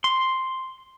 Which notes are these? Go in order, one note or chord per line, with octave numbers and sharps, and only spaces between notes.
C6